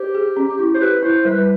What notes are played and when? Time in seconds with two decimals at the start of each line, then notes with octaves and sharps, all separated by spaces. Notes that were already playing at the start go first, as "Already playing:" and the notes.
Already playing: G4 C5
0.15 G#4
0.37 C#4
0.59 E4
0.74 C5
0.81 G4 B4
1.03 E4 C5
1.25 G3 B4